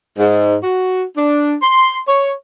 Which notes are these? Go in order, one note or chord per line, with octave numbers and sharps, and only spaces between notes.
G#2
F#4
D4
C6
C#5